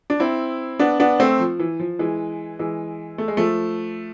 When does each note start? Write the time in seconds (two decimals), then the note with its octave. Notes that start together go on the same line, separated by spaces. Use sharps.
0.10 D4
0.20 C4 E4
0.79 B3 D4
1.00 B3 D4
1.20 A3 C4
1.40 F3
1.59 E3
1.79 F3
1.99 E3 G#3
2.59 E3 G#3
3.18 A3
3.28 G#3
3.37 F3 A3